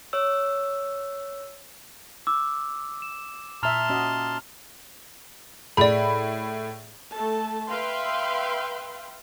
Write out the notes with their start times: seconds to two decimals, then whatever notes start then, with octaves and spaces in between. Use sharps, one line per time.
0.13 C#5 E6
2.27 D6 E6
3.02 E7
3.63 A#2 E5 A5 A#5 C6 F6 F7
3.90 C#4 F#4 D#5
5.77 A2 G#4 D5 B5
7.13 A3 A4 A5
7.69 B4 E5 F5 G5 C6